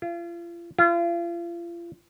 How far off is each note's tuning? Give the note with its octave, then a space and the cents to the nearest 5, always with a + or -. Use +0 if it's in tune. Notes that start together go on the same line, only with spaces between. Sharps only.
F4 -35
F4 -35